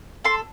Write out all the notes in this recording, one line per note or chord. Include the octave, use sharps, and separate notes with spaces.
A4 C6